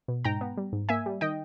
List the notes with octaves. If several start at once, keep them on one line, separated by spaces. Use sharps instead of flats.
B2
G#2 G5 A#5
B3
G3
G#2
A#3 E5 G#5
G3
D#3 D#5 G5